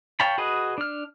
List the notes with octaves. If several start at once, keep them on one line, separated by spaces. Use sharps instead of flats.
C#5 F5 G5 A5 B5
F#4 G#4 B4 D#5
D4 F6